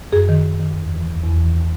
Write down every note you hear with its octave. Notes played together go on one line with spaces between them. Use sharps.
F#2 G#4
D#3
D#3
D#3
E2
E3
E2
E2
E3